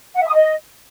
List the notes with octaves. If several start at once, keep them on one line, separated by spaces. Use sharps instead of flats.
F#5
E5
D#6
D#5